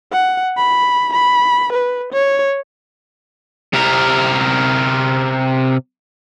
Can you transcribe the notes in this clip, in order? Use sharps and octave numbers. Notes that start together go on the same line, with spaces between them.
F#5
B5
B5
B4
C#5
C3 A#4